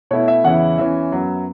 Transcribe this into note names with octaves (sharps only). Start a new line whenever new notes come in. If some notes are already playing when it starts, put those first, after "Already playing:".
B2 A3 E4 C#5
E5
E2 C#3 E3 C#4 E4 F#5
E2 E3 C#4 E5
F#2 F#3 B3